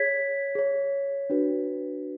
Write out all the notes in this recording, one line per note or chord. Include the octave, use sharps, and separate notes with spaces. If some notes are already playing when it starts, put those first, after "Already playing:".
Already playing: G#4 C#5 G#6 B6
G#4 C#5
D4 F#4 B4